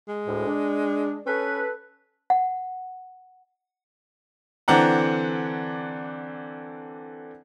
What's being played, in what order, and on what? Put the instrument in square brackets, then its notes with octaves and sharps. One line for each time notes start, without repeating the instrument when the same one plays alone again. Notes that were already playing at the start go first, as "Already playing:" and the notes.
[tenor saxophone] G#3
[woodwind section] D2 A2
D4
[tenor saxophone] C#4 [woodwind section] A4 B4
[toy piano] F#5
[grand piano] D3 E3 C4 D4 F#5 A#5